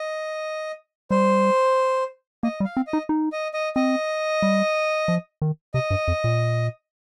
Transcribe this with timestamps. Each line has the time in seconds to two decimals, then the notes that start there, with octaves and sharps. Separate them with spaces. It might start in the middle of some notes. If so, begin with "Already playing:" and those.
Already playing: D#5
1.11 G3 C5
2.43 A#3 D#5
2.60 G3
2.65 F5
2.77 C4
2.87 D#5
2.93 D#4
3.09 D#4
3.32 D#5
3.54 D#5
3.76 C4 D#5
4.42 G3
5.08 F3
5.42 D#3
5.74 C3 D#5
5.90 G2
6.08 F2
6.24 A#2